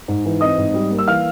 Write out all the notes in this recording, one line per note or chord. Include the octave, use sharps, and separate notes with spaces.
G#2
E3
C4 D#5 D#6
G#2
G3
A#3
E6
E3 F5 F6